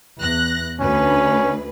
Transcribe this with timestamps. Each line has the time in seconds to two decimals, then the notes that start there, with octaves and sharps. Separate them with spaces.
0.20 E2 F#6 A#6
0.80 D2 C#4 B4